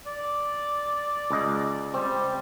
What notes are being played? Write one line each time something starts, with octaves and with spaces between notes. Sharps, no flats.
D5
C#2 D#5
G3 C4